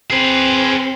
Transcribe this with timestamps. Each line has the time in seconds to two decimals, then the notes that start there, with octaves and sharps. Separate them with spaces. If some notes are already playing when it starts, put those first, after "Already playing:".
0.10 C4 G#4 B4